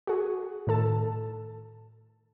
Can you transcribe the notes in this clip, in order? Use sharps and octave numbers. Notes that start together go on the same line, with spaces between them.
F#4 G#4
A2 D#3 A4 A5